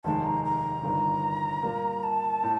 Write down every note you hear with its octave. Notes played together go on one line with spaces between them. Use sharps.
F1 D#2 D#3 G#3 A5
A#5
A#5
G1 G2 D#3
A#2 G3 A#3
A5
A2